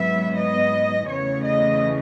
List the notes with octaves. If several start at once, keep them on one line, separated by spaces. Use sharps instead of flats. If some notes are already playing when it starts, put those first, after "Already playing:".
Already playing: G#2 F#3 B3 E5
D#5
E2 C#3 E3 A3 C#5
D#5